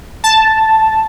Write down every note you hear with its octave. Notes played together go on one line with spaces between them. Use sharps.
A5